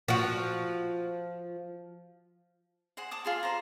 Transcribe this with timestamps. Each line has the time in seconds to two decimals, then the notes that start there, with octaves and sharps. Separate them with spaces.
0.08 F3 F#4
2.97 G#4 C5 F#5
3.11 A5 D6 D#6
3.24 F4 G#4 C6
3.43 C5 A#5